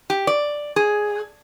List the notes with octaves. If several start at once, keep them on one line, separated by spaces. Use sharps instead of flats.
G4
D5
G#4